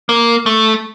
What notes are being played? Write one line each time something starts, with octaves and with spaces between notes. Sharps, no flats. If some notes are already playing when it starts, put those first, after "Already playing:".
A#3
A3